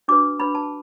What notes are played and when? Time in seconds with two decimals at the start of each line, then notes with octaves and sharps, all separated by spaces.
0.08 D4 F#4 B4 D6
0.40 D4 B4 B5
0.55 A5